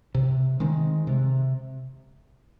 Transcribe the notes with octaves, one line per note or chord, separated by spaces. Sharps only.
C3
D#3 G#3 C4
C3